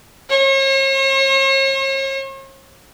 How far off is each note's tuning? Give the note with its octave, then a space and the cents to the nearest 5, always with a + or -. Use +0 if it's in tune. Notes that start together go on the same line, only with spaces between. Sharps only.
C#5 -45